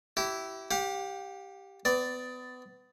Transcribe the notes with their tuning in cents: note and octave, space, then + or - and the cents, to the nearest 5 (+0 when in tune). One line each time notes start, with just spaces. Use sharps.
E4 +0 G4 -30
G4 +0 F5 +45
B3 +30 D5 +0